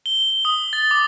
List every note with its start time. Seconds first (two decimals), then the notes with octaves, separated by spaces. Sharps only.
0.06 G7
0.30 G7
0.45 D#6
0.73 A6
0.91 D6